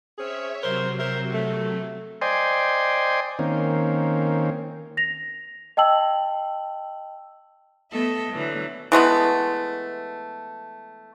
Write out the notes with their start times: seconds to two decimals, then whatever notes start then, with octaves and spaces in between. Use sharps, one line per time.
0.18 C4 C#4 G#4 C#5 E5
0.63 C3 F#3 A#4 C5
0.99 A#4 C5 E5
1.33 A3
2.21 C5 D5 D#5 G5 G#5 C6
3.39 D#3 A#3 C4 C#4
4.97 A#6 F7
5.77 D#5 G5 A5 E6 F#7
7.92 A3 B3 A4 D#5 E5
8.31 D3 E3 F#3 A3
8.92 E3 G#3 A3 B3